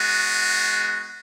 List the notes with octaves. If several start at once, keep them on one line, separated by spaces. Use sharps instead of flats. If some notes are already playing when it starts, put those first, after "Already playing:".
Already playing: G#3 B3 F#4